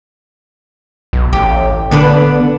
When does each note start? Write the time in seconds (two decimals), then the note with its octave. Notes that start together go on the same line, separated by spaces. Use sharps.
1.13 B1
1.33 A1 G4
1.91 D3 B3 D4 B4